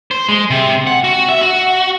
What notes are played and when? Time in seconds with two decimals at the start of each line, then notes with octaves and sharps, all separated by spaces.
0.11 C5
0.29 G#3
0.50 C3
0.87 F#5
1.04 F#4
1.29 E5
1.41 F#4